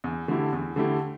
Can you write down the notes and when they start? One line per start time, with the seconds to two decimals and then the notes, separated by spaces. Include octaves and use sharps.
0.04 E2
0.28 D3 A3 E4 G4
0.53 E2
0.76 D3 A3 E4 G4